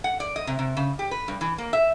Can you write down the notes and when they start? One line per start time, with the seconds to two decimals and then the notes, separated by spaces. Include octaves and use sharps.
0.04 F#5
0.20 D5
0.36 D#5
0.47 C3
0.59 C3
0.77 C#3
0.99 G4
1.11 B4
1.28 G2
1.41 E3
1.58 A#3
1.73 E5